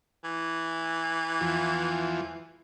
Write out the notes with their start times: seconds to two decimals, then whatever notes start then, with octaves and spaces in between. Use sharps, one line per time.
0.24 E3
1.41 E2 F3